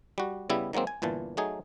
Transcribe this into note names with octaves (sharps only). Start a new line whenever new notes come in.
G3 F#4
C#3 G3 B3 E4
D#3 F#3 G#3 A#3 C4
G#5
G1 A#2 E3 A5
F#3 A3 D#4 G#4